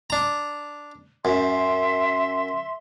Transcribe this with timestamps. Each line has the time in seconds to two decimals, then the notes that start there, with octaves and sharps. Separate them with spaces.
0.10 D4 A#5
1.25 F#2 E5 C6